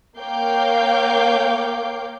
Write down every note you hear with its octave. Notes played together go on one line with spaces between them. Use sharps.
A#3 C#5 F5 G5 D6 G6